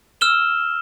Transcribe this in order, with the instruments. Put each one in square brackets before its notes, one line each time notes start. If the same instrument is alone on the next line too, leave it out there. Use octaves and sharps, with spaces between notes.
[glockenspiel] E6 F6 E7 G7